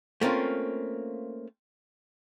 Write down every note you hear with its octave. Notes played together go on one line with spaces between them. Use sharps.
A3 A#3 C4 C#4 F4